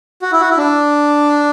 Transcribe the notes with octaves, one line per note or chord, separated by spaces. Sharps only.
F#4
E4
F#4
E4
D4